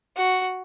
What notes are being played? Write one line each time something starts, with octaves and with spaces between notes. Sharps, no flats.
F#4